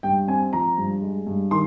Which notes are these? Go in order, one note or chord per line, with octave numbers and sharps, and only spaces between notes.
G2 G5
C4 G#5
F3 A#5
G2
G#3
G2
D#3 C6